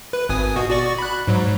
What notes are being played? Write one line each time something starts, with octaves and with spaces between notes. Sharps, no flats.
B4
G#1 G#5 D#6
B2 F#4
F#4 D5 C#6
B5 F#6
G#2 F#3